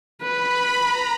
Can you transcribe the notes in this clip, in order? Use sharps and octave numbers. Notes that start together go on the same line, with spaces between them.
B4 B5
A#5